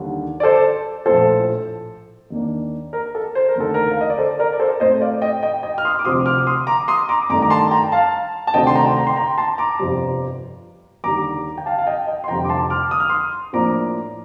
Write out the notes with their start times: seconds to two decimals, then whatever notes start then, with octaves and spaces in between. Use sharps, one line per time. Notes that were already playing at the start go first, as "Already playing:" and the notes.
Already playing: D#2 D3 G3
0.40 D5
0.43 A4 C5
1.06 A#1 A2 F3 A4 C5
2.30 D#2 D#3 A#3 D4
2.93 A#4
3.15 A4
3.35 C5
3.48 A#4
3.56 D#2 D3 A3 A4
3.74 A#4
3.91 F5
4.01 D#5
4.10 D5
4.18 A4 C5
4.39 A#4 D5
4.53 D5
4.59 A4 C5
4.80 A2 A3 C4 C5 D#5
5.01 D5 F5
5.22 D#5 G5
5.43 D#5 G5
5.63 D#5 G5
5.78 F6
5.85 C6 D#6
5.99 D6
6.05 D2 C3 F3 C6 D#6
6.26 D6 F6
6.47 C6 D#6
6.67 A#5 D6
6.88 C6 D#6
7.09 A#5 D6
7.29 G2 D#3 A3 D4 A#5 D6
7.42 A#5
7.50 A5 C6
7.71 G5 A#5
7.92 F5 A5
8.47 A5
8.54 D2 C3 D#3 A3 D4 D#5 G5
8.67 C6
8.75 G5 A#5
8.97 G5 A#5
9.07 C6
9.16 G5 A#5
9.38 A5 C6
9.58 A#5 D6
9.79 G1 F2 C3 G3
11.04 D#2 D3 G3 A#5 D6
11.58 G5
11.66 F5 A5
11.78 F5
11.87 D#5 G5
12.07 D#5 G5
12.24 C6
12.28 F1 F2 D3 G3 G5 A#5
12.45 D6
12.49 A5 C6
12.70 D6 F6
12.91 D#6
13.00 F6
13.09 C6 D#6
13.53 A2 F3 A#3 D4 A#5 D6